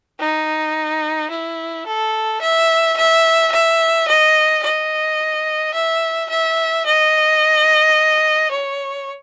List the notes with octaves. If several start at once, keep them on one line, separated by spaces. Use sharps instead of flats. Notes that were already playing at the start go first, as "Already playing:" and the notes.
D#4
E4
A4
E5
E5
E5
D#5
D#5
E5
E5
D#5
C#5